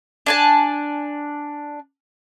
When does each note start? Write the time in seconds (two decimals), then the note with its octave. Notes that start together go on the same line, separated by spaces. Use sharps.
0.26 D4 G#5 A5